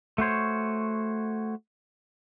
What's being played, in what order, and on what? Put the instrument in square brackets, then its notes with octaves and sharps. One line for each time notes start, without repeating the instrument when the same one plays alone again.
[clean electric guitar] A3 F#4 C5 C#5